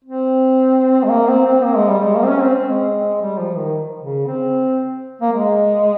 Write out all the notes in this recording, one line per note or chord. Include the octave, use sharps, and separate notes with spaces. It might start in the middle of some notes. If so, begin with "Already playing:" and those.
C4
G#3
A#3
C4
C4
A#3
G#3
G3
G#3
A#3
C4
C#4
C4
C4
G#3
G3
F3
D#3
C#3
C4
A#3
G#3